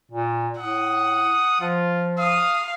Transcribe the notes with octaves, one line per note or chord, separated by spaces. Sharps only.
A#2
A2 F#5 D#6
F3 F4
F5 D#6